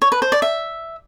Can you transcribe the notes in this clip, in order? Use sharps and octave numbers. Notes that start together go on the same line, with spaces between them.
C#5
B4
C5
D5
E5